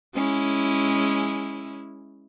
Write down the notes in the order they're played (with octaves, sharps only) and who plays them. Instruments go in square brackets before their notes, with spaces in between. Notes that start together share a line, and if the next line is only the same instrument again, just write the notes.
[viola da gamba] G#3 C#4 E4